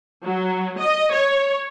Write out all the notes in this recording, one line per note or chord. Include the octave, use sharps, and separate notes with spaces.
F#3
D#5
C#5